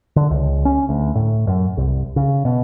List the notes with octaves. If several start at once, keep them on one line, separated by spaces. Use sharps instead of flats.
D3
C#2
C#4
D2
A2
F#2
C2
C#3
B2